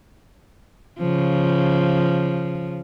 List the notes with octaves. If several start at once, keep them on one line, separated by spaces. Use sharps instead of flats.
C#3 F3